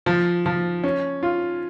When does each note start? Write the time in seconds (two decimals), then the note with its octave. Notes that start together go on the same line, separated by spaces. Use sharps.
0.06 F3
0.46 F3
0.84 C#4
1.23 F4